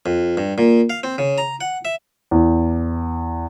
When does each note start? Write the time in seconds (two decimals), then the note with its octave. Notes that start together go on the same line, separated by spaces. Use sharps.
0.06 F2
0.37 G2
0.58 A#2
0.90 F5
1.03 C4
1.18 C#3
1.38 A#5
1.61 F#5
1.85 E5
2.31 E2